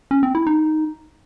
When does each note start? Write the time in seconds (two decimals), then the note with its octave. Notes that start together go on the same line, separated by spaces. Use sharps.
0.11 C#4
0.23 C4
0.35 E4
0.47 D#4